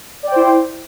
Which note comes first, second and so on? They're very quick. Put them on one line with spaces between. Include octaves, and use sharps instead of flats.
D5 G5 C5 E4